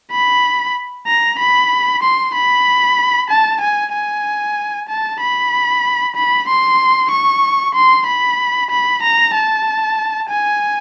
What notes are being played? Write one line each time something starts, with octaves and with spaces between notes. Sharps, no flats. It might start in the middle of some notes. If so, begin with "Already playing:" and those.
B5
A#5
B5
C6
B5
A5
G#5
G#5
A5
B5
B5
C6
C#6
C6
B5
B5
A#5
A5
G#5